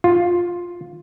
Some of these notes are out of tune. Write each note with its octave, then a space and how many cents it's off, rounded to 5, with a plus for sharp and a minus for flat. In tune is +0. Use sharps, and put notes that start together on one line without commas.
F4 +10